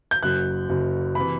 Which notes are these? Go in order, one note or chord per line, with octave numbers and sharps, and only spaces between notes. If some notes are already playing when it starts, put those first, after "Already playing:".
G6
F#1 F#2 F#3 F#6
F#1 F#2 F#3
C3 E3 B5